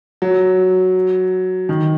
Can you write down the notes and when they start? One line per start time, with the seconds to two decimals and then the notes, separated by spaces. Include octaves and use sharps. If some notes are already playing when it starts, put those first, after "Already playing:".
0.22 F#3
1.69 D#3